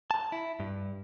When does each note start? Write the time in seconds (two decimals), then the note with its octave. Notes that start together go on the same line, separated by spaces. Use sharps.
0.11 A5
0.32 E4
0.60 G2